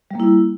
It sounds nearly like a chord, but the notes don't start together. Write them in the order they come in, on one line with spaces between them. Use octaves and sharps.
G3 A#3 E4